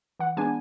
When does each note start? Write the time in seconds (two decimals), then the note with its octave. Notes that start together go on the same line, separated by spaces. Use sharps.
0.19 E3 F#5
0.37 G#3 B3 D4 G#5